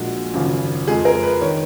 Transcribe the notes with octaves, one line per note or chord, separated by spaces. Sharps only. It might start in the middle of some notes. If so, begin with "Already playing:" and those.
Already playing: A#1 A#2 G#3 F#4
G#1 F#2 C#3 F3
F2 F3 G#3 G#4
A#4
B4
D#3 C#5